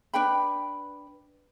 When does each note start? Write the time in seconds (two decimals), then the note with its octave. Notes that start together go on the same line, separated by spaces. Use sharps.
0.14 D4 B4 G5 B5